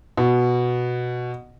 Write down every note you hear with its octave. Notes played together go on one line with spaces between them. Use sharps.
B2